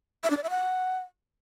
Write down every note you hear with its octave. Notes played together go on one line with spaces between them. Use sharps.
E5
D4
D5
E5
F#5